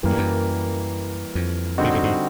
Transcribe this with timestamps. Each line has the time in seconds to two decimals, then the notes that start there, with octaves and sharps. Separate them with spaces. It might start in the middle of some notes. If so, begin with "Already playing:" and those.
0.03 F#2 E3 G3 A#3
0.10 G2
0.18 F#2
1.35 F2
1.78 D3 G3 C4 D#4 F#4
1.84 A#2
1.95 A2
2.03 G#2